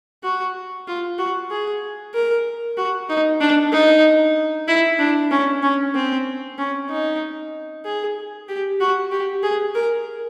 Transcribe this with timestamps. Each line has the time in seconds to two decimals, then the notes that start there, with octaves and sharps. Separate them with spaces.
0.23 F#4
0.88 F4
1.19 F#4
1.51 G#4
2.14 A#4
2.77 F#4
3.09 D#4
3.41 D4
3.72 D#4
4.68 E4
4.99 D4
5.31 C#4
5.63 C#4
5.95 C4
6.58 C#4
6.89 D#4
7.85 G#4
8.49 G4
8.80 F#4
9.12 G4
9.43 G#4
9.75 A#4